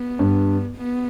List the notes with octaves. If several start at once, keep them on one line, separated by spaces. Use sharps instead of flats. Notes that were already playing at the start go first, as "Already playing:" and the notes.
Already playing: B3
G2
B3